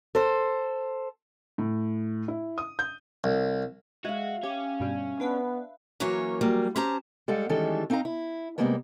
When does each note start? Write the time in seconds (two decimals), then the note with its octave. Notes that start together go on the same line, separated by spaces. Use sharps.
0.15 A4 C5
1.58 A2
2.28 E4
2.58 D#6
2.79 G6
3.24 C2
4.05 G#3 F#4 E5 F5
4.43 C#4 G4
4.80 G2 B2 G3
5.20 B3 D4 B4
6.00 E3 F#3 A#3 C#4 A#4 C#5
6.41 E3 F#3 G3 A#3
6.76 C#4 G4 C5 A5 A#5
7.28 G3 G#3 A4 F5 F#5
7.49 D#3 E3 G3 G#3 C#4 A4
7.90 C4 D#4 F5 G5 A#5
8.05 E4
8.58 C3 F3 G3 G#3 A#3 B3